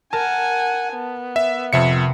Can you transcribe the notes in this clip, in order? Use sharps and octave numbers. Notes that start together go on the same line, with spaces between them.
A#4 F#5 G#5 A5
B3
E5
F2 C3 E5 C#7